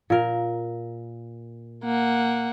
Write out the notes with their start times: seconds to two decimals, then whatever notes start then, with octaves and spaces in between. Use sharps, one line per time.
0.10 A#2 A#4
1.84 A#3 F#5